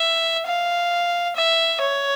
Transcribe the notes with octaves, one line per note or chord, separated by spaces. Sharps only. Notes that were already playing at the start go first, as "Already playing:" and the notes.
Already playing: E5
F5
E5
C#5